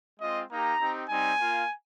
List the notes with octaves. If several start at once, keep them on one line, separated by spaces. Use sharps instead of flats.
G#3 C4 F4 D#5
A#3 D#4 G4 A#5
C4 D#4 G4
G3 C4 D#4 G#5
A#3 F4